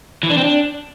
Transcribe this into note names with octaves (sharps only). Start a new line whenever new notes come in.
E3
D4
C4
D4